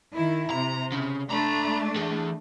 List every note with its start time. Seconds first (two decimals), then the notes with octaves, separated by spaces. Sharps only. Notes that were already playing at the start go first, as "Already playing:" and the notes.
0.13 D#3 E4
0.50 C3 A#5
0.92 C#3
1.30 A3 D4 A#5 B5
1.96 E3 G#4